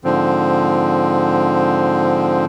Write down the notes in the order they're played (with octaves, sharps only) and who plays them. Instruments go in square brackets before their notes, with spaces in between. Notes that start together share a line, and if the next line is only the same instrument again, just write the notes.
[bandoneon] G#2 D3 F3 C4